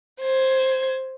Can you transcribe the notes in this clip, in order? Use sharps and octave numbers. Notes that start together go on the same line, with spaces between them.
C5 G#6